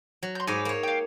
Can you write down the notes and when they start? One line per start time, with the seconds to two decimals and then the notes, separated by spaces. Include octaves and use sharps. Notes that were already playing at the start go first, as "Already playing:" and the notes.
0.23 F#3
0.35 C6 G6
0.47 G#2 C#5 D#5 G#5 B5 D6
0.65 A#3 C#5
0.83 F5 G5